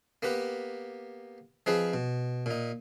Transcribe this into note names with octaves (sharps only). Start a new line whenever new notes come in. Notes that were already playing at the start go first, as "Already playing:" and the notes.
A#3 B3 G4 B4
F3 C4 D#4 G#4 B4
B2
A#2 D#4